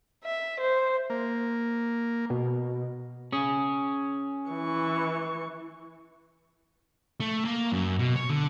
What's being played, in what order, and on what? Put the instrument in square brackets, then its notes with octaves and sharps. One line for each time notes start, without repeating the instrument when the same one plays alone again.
[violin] E5
C5
[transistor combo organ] A#3
[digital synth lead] B2
[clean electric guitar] C#4 G#4
[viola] E3 C#6
[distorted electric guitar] A3
A#3
F#2
B2
C#5
D3